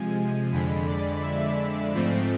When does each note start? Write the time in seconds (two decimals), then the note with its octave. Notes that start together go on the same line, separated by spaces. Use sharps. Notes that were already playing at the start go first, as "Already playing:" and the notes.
Already playing: C3 F3 G#3 G#5
0.52 F2 D3 G#3 B5
0.87 D5
1.22 E5
1.94 G#2 F3 A3 C4